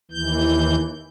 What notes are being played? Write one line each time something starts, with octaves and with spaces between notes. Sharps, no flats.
D#2 E3 G6